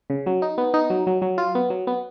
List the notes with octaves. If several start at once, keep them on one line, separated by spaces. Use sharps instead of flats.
C#3
F#3
D#4
B3
D#4
F#3
F#3
F#3
F4
B3
F#3
B3